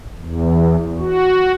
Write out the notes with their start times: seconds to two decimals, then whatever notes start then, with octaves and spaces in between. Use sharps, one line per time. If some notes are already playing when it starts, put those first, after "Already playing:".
0.18 E2
0.99 F#4